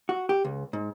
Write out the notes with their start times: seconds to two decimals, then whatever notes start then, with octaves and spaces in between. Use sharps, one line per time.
0.09 F#4
0.29 G4
0.44 C#2
0.73 G#2